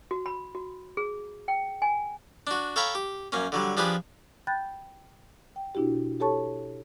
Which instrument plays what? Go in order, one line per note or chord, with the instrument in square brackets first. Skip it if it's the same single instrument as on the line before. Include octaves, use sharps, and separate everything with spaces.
[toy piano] F#4
B5
F#4
G#4
G5
G#5
[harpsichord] D4 F#4
A4 C#5 F5 G5 A#5 B5
G4
F#2 A#3 C#4
D3 F#3 G3
F3 D4 G4 G#4 B4
[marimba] G5 B5 F#6 G6 A6
G5
B2 D4 E4 F#4 G4
G4 A4 C#5 A5 C#6